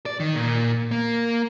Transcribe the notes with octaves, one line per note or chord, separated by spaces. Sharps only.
D5
D#3
A#2
A#3